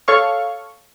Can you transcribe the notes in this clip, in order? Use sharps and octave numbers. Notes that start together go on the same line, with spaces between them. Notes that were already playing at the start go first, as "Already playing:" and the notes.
A4 C#5 F5 C#6